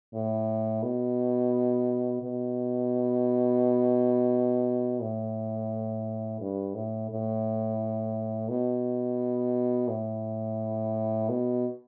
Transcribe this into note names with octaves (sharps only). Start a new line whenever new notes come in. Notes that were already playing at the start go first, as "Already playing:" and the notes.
A2
B2
B2
A2
G2
A2
A2
B2
A2
B2